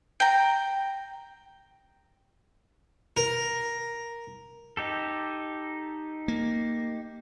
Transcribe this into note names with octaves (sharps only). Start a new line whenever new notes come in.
G5 A#5
A#4
D#4 G4 A4
A#3